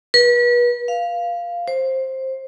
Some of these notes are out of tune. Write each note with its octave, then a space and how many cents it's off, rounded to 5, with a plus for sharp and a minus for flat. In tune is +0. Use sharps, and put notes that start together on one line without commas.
B4 -35
F5 -5
C5 +10